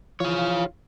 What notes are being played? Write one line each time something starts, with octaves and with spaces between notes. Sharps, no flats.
E3 F3 F4 C#5 F5